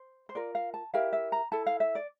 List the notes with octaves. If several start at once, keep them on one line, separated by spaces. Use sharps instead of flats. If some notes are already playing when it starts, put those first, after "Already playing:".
Already playing: C5
C5
F4 A#4 D5
F5
A5
E4 G4 A#4 F5
E5
A#5
E4 A4 A5
F5
E5
D5